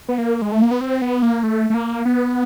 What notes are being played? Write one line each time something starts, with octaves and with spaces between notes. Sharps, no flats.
B3
A#3
G#3
A3
A#3
B3
C4
B3
A#3
A3
A3
A#3
B3